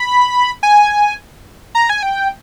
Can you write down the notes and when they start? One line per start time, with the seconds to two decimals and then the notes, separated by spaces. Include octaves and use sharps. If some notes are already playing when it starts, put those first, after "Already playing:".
Already playing: B5
0.63 G#5
1.75 A#5
1.89 G#5
2.03 G5